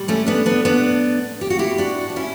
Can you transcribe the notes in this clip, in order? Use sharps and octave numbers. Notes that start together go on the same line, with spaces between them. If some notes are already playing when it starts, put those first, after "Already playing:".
Already playing: A2 G3
A3 C#4
B3 D4
B3 D4
B3 D4
G4
F#4
E4 G4
D4 F#4
D4
C#4 E4